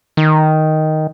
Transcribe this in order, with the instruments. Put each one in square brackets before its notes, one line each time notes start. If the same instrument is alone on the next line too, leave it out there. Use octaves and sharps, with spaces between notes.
[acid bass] D#3